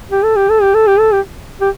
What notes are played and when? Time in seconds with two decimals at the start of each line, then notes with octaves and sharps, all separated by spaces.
0.11 G4
0.24 A4
0.36 G4
0.50 A4
0.62 G4
0.74 A4
0.87 G4
0.99 A4
1.13 G4
1.61 G4